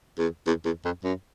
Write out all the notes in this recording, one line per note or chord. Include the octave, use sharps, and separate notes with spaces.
E2
E2
E2
F2
F#2